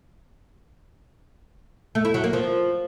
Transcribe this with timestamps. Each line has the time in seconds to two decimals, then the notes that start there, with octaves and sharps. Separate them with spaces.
1.95 A3
2.05 E4
2.14 F#3
2.24 A#3
2.33 F3